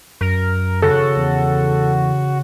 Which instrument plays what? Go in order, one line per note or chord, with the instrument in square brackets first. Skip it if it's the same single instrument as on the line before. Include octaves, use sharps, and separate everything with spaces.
[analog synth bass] F#2 [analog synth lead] A#4
[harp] C#3 [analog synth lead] F#4 [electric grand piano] A4
[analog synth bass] E2